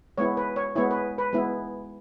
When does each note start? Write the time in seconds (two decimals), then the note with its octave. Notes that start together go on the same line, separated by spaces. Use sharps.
0.18 G#3 B3 E4 C#5
0.37 B4
0.56 C#5
0.75 G#3 B3 E4 C#5
0.91 B4
1.18 B4
1.33 G#3 B3 E4